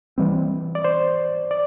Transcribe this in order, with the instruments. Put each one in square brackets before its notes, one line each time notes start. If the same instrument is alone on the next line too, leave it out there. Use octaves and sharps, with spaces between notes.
[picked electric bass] E3 G3 C4
[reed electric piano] D5
C5
D5